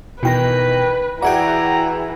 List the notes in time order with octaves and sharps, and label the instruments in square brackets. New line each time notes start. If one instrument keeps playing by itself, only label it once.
[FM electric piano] B2 G5 A#6 [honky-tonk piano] D#3 E3 [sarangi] B4
[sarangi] E3 [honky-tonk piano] F#4 G#4 G5 [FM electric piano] D5 E5 F#5 [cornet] A#5